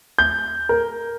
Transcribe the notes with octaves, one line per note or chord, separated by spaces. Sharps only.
G6
A#4